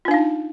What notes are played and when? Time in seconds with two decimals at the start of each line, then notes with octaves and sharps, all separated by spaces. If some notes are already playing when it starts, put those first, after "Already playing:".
0.05 F4
0.08 D4
0.11 F5
0.14 D#4